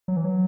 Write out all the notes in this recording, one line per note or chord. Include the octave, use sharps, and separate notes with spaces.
F#3
E3
F#3